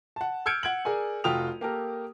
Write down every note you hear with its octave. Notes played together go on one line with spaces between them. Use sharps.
F#5 A5
E6 F6 G6 G#6 C#7 D7
F#5 G#6 D7 F#7
G#4 A#4 D5 G#5
F1 F4 F#4 G5 D#6 F7
A#3 G4 A4 A#4